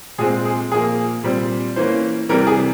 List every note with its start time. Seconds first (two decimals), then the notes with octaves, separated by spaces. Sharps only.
0.18 A#2 G#3 C4 G#4
0.45 G#4
0.72 A#2 F3 A#3 G#4
1.23 A#2 G3 C4
1.76 E3 A#3 C#4 C5
2.29 C3 E3 G3 A#4
2.47 G#4